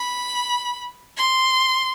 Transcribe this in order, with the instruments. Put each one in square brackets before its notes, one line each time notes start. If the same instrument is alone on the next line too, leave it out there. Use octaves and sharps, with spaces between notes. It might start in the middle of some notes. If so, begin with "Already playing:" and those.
Already playing: [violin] B5
C6